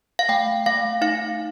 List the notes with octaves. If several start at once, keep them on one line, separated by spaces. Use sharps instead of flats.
F5
A3 G5
A3 F5
D#4 F5